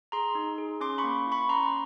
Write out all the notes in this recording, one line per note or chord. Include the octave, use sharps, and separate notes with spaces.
G#4 A#5 C6
D#4
G#4
C#4 C6 D6
B5 C#6
A#3
E4
B5 C#6
C#4 A#5 C6